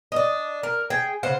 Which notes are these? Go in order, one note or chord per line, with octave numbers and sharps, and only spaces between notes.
D4 D#5
A#4
G#4 G5
C#3 C5 F#5